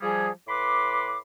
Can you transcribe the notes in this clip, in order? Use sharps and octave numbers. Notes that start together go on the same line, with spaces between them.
F3 G3 G#4
A2 B4 B5 C6 D6